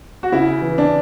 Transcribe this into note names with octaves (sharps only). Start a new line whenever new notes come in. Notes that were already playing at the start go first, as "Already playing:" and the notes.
F#4
C#3 E4
E3
D4